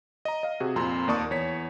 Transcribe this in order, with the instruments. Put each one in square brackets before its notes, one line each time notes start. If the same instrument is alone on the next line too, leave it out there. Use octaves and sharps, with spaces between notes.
[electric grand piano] D#5 A#5
D#5 F5
C3 F#4 G#4
F2 A#2 A#5 C6
D#2 A#3 D5 A5 C#6 D#6
E2 C#5 B6